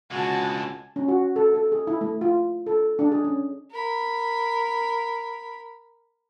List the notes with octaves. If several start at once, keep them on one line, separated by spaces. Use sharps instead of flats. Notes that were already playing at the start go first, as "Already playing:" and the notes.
C#2 B2 D3 F#4 G#5 A5
C#4
F#4
A4
A4
G#4
E4
A3
F4
A4
D4
G#4
C#4
A#4 B5